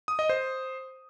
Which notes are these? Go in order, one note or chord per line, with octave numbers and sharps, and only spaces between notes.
D#6
D#5
C5